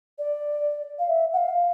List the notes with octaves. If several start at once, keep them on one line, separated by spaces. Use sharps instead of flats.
D5
F5
E5
F#5
F5